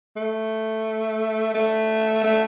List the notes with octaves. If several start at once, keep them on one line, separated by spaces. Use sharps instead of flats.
A3
A3
A3